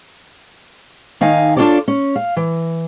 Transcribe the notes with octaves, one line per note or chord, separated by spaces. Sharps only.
D#3 D#4 F5 G#5
D4 F4 G#4 A4 C#5 D5
C#4
F5
E3